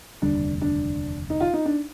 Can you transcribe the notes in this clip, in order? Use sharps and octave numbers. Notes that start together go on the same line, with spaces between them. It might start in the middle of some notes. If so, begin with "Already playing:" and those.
F1 D#2 D3 G3 D4
D4
D#4
F4
D#4
D4